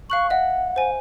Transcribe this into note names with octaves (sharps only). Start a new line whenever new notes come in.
F5 C#6 F#6 F#7
D#5 E5 F#5
C5 G#5